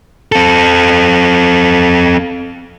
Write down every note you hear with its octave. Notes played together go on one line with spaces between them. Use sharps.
C4 A4